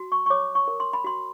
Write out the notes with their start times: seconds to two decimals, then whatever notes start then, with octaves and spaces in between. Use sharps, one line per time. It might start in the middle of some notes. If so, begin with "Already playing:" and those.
Already playing: F#4
0.12 C#6
0.26 C#6
0.30 C#5 D6
0.55 C#6
0.68 A#4
0.80 C6
0.93 B5
1.04 F#4 C6